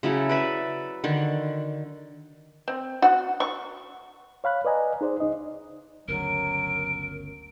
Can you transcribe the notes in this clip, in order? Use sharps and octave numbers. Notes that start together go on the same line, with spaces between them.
C#3 F#3 E4 A4
B4 D5 E5 B5
D3 D#3
C4
F#4
C#6
C#5 F5 B5 F#6
B4 D5 D#5 G#5 A#5
D#4 G#4 C5 D5
C#2 D#4 D#5
G1 D2 C#3 F#3 A#4 D7